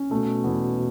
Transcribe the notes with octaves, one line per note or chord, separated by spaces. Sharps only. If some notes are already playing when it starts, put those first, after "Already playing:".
Already playing: C#4
B2 A3
E2